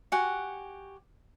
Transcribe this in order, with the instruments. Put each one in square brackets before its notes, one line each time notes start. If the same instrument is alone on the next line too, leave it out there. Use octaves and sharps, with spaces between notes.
[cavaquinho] F#4 G4 F#5 G#5